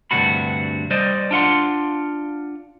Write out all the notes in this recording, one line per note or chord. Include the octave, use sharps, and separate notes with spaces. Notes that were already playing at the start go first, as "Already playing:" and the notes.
D2 G2 C3 D4 F#4 B5
G3 C5 D5 D#5
D4 F4 F#5 C6